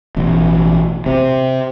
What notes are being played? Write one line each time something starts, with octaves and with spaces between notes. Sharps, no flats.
A1 B2
C3